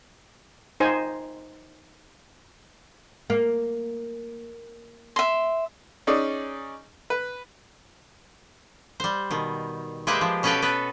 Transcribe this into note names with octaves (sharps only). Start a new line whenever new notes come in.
D#4 C5 G#5
A#3
E5 C6
C#4 D#4 G#4 D5
B4
G3 C5
B2 D#3
G#3 A#3 G4 B4 C5 E5
F3
B2 C#4 A4 B4 F5 G5
B3 F#4 A4 B4